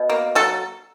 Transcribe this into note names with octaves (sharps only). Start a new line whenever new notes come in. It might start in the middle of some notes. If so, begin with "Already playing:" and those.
Already playing: B2
A#3
F#3 A4